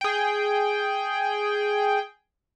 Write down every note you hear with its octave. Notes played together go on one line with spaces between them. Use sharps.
G#4 G5